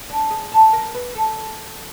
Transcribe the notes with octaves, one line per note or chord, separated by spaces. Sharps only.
D4
G#4
A4
A#4
B4
A4